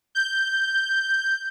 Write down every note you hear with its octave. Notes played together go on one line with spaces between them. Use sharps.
G6